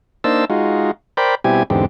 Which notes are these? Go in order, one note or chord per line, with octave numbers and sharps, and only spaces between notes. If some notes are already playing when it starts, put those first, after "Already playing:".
A#3 D4 D#4 C5 A5 E6
G#3 D#4 F4 F#4
A#4 C5 D5 G5 B5
B2 G3 C4 E4 G4 G#5
E2 G#2 D3 C4 G4